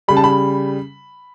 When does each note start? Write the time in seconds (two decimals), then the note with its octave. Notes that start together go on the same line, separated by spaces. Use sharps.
0.08 C#3 G3 B5
0.17 A5
0.24 B5